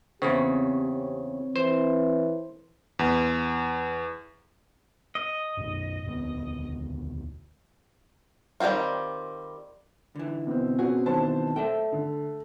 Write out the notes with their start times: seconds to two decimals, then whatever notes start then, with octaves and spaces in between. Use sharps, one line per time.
0.22 E2 C#3 C4 G4 C#5
1.56 E3 C5
2.99 E2
5.15 D#5
5.57 F#2 B2
6.05 E1 D2 B3
8.60 D#3 G3 A3 C4 F4
10.16 D3 E3
10.47 B2 C4
10.79 C#4 F#4 G#4
11.06 D#3 E3 F#3 C5 A5
11.56 A3 D5 E5 G5
11.92 D3